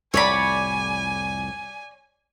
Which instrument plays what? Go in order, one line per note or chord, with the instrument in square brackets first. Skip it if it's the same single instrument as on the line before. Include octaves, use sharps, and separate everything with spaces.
[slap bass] C2 F2 A2 [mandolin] C#5 D5 B5 [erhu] G#5